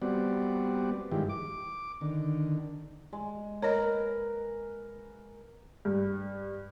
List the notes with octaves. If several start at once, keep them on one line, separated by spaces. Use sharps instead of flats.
G3 B3 C4 F#4 D5
G2 D#3 F3 G#3 E4 G4
D6
D3 D#3
G#3
A#4 B4 C#5 D#5
G2